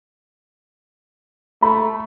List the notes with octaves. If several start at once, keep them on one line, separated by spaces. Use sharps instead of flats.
A3 B5